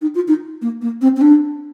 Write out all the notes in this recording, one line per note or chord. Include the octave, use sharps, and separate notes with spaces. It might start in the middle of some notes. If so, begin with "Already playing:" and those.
D#4
F4
D#4
A#3
A#3
C4
C4
D4